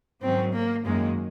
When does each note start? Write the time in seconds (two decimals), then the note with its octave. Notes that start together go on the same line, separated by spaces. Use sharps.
0.22 G#2 D#3 F#3 C4 C#4
0.54 A#3
0.85 F#2 D#3 G#3 A#3